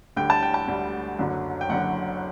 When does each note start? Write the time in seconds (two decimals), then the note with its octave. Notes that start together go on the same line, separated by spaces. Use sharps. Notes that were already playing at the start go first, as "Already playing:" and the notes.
0.16 D2 D3 G3 G5
0.30 A5
0.43 G5
0.54 A5
0.68 D2 D3 G3
1.18 F#1 F#2 D3 F#3
1.61 G5
1.69 F#1 F#2 D3 F#3 F#5